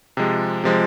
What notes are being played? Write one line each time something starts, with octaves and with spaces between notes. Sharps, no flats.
C3 F3 G#3
C3 F3 G#3